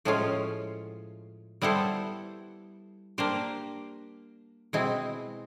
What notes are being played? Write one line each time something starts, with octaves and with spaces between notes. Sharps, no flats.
A2 F3 G#3 C#4 F4
G3 B3 E4 A4 C5
A#3 D4 G4 C5
B2 G#3 C4 E4